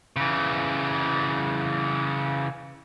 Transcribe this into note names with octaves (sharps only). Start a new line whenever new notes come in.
C#3 E3